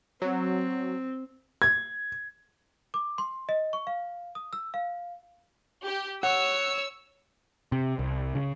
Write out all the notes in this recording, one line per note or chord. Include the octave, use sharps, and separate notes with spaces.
F#3 C4
G#6
D6
C6
D#5
C#6
F5
D#6
E6
F5
G4
C#5 F#5 E6
C3
C2
C#3